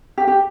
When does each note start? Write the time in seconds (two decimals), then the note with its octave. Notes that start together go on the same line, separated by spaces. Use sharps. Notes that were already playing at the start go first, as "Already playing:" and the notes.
0.18 G4
0.28 G4